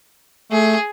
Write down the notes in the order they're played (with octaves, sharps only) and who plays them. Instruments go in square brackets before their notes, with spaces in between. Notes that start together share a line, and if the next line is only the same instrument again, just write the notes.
[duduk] A3 [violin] G#4